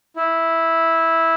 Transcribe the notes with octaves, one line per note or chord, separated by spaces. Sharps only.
E4